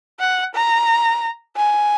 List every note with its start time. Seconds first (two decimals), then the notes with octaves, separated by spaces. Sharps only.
0.20 F#5
0.55 A#5
1.56 G#5